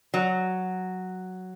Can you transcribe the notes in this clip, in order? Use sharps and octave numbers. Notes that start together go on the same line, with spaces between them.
F#3